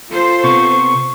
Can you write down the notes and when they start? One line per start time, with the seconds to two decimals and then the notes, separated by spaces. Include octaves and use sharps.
0.10 F4 A4 C5
0.44 C3 B3 C#6